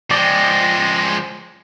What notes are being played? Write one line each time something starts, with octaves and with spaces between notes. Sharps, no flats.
F3 G#3 D5 G5 A#6